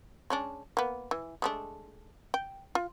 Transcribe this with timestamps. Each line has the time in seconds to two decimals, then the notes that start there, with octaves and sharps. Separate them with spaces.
0.30 G#3 C#4 D4
0.77 A#3 B3
1.11 E3
1.42 G#3 A3 D4
2.34 G5
2.75 F4